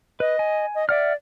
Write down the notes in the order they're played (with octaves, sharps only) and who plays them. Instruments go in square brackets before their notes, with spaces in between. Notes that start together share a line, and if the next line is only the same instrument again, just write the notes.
[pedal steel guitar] B4 [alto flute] D#5
[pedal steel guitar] G#5
[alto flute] D#5
[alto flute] D5 [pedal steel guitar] E5 F#5 F6